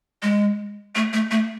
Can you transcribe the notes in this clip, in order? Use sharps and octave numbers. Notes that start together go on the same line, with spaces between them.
G#3
A3
A3
A3